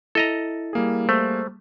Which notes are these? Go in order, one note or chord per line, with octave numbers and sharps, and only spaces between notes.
E4 A4 D#5 A#5
G3 A#3 G#4
A3 C5